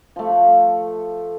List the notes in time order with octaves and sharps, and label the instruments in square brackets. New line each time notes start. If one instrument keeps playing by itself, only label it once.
[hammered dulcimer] F3 A3